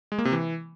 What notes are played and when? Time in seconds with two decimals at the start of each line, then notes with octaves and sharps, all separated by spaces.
0.12 G#3
0.19 A#3
0.25 C3
0.32 E3